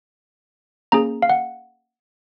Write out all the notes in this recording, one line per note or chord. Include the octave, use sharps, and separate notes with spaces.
A#3 C#4 G#4 A#5
F5
F#5